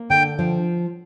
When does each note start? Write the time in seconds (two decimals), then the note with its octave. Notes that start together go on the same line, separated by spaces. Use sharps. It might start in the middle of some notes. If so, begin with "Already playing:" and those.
Already playing: A#3
0.10 D3 G5
0.39 F3